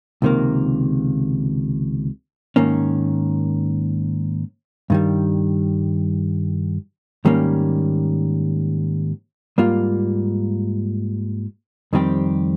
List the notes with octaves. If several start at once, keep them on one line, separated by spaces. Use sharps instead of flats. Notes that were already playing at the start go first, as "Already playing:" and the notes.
C#2 C3 D#3 A#3
G#2 D#3 A#3 C#4
G2 D#3 G3
G#2 D#3 G3 A#3 C#4
G#2 G3 A#3 F4
F2 D#3 G3 C4 G4